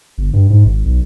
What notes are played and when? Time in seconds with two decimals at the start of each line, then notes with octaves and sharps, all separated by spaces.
0.18 G1
0.33 G2
0.50 G#2
0.65 G#1
0.85 B1